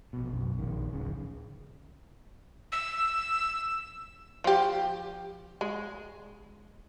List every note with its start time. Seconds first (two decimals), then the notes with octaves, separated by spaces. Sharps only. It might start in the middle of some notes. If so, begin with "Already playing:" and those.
0.13 A#1 B2
0.33 B1 F#2
0.59 A#1 D#3
0.93 D1 C#3
2.72 E6
4.44 F3 G4
5.61 G#3